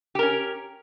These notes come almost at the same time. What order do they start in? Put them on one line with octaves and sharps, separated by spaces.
G4 A#4 C#4